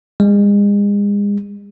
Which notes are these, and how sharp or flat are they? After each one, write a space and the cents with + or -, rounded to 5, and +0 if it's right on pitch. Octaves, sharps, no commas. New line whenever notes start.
G#3 -35